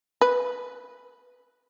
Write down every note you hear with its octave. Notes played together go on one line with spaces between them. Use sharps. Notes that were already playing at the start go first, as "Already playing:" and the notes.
B4